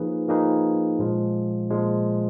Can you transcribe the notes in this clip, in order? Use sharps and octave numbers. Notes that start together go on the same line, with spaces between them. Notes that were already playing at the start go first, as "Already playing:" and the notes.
Already playing: F3 A#3 D#4 G#4 B4
F3 A#3 D#4 G#4 B4
A#2 F3 G#3
A#2 F3 G#3